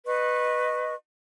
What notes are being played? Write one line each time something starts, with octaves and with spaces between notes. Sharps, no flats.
B4 D#5 C#6